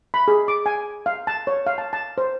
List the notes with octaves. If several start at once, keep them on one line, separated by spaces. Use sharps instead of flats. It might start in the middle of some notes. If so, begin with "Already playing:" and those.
B5
G#4
D6
G#5
F5
A5
C#5
F5
A5
A5
C5